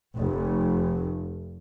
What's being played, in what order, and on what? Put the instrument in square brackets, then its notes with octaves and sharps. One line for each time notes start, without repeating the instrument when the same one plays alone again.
[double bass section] F1